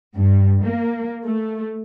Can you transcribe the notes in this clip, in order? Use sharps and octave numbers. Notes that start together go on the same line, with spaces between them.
G2
A#3
A3